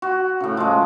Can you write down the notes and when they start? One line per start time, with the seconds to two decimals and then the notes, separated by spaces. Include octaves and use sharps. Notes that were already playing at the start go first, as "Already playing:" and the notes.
0.02 F#4
0.40 A2 C#3
0.57 F3 G#3